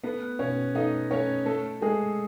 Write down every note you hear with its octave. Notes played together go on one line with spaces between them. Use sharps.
A3 B3 B4
B2 C#4 C#5
A3 D#4 D#5
A3 C#4 C#5
A3 A4
G#3 A3 G#4